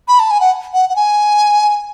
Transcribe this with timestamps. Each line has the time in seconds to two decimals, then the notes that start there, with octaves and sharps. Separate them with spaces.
0.08 B5
0.20 A5
0.31 G#5
0.41 F#5
0.73 F#5
0.89 F#5
0.96 G#5